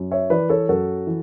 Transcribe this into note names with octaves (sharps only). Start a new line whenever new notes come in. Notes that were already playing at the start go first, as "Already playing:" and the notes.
Already playing: F#2
C#5 E5
E3 B4 D5
A4 C#5
F#2 F#4 A4
E3